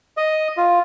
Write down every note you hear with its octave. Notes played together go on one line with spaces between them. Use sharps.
D#5
F4